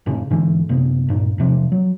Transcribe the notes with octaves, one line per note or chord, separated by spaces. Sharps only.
F1 A2 C#3
G#2 D3 E3
F#1 C3 B3
C#2 G2 A#2
E1 C3 F3
F#3